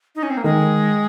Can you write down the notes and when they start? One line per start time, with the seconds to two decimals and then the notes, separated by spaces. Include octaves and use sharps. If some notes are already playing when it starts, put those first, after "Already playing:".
0.15 D#4
0.23 C#4
0.30 C4
0.37 A#3
0.44 D#3 G#3